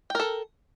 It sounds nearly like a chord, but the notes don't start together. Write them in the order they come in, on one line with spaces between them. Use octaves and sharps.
G5 A#4 A4